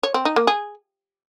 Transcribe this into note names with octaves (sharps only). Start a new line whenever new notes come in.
C#5
C4
D#4
A#3
G#4